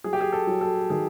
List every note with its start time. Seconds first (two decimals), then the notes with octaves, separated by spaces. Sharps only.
0.04 F#3 G#4
0.13 G4
0.21 G#4
0.32 A4
0.47 F#3
0.61 A4
0.90 D#3 G#4